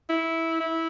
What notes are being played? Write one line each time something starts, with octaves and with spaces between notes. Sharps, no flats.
E4
E4